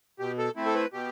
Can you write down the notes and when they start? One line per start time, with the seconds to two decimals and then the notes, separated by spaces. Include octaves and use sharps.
0.19 B2 G4
0.38 A4
0.56 A3 C4 E4
0.66 A4
0.75 B4
0.93 B2 G4